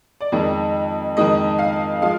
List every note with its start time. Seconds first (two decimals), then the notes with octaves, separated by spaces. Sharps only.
0.21 D5
0.32 F2 D#3 G#3 D#5
1.17 F2 D#3 G#3 D#5
1.59 F5
2.02 F3 G#3 F5